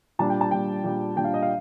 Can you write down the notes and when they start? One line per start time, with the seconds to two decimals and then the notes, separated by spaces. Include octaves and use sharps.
0.19 A#2 G3 D4 A5
0.30 G5
0.41 A5
0.51 A#2 G3 D4 G5
0.84 A#2 G3 D4
1.16 A#2 G3 D4 G5
1.24 F5
1.34 D#5
1.43 F5